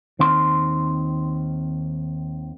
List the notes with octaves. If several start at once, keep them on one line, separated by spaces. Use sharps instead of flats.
D#2 D#3 C4 C6